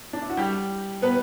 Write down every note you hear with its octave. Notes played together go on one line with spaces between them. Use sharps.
D4
E4
F#4
G3 G4
B3 B4